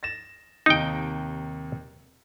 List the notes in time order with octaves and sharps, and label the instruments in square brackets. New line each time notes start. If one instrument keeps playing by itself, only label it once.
[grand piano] A6 A#6 E7
[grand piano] D#2 C3 [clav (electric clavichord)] D#4 G5